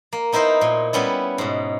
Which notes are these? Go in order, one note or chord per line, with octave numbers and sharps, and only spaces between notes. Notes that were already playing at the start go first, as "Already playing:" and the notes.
A#3
B3 D#4 E4 A#4 C5
A#2
G3 B3 C#4 E4
G#2 B2